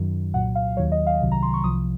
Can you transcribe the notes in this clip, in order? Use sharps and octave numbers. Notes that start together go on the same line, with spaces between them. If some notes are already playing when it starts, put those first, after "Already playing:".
Already playing: F#2 D#3 F#3
C2 A#2 F#3 F#5
F5
D#2 D#3 F#3 C#5
D#5
F5
C2 C3 D#3 F#3
A#5
C6
C#6
C2 C3 F3 D#6